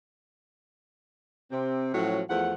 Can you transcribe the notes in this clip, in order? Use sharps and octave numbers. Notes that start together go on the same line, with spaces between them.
C3 C4
A2 F3 F#3 C#4 F#4
E2 F3 A3 F#5